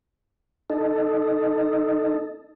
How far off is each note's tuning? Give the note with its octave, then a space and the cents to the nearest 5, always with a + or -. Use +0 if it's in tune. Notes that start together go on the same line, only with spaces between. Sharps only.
D#4 -10 A4 +0